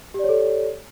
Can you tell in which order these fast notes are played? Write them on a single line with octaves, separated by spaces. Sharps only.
G4 D5 C#5 A4